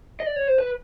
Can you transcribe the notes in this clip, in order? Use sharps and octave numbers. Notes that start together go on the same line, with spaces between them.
D#5
D5
C#5
C5
B4